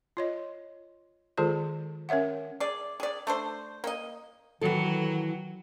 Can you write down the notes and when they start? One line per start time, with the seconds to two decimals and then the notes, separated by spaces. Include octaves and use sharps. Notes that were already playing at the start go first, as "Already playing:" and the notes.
0.17 F4 C#5 D#5
1.37 D#3 G#3 F4 G#4 A4 C5
2.09 C#4 A#4 C#5 E5 F#5
2.60 G#4 D5
3.00 G#4 D5
3.27 A3 D4 C5
3.84 A#3 D#5
4.61 D#3 E3 F#3 A4